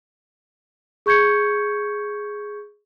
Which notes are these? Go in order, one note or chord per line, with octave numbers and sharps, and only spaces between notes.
G#4 C#6 G6 G#6 C#7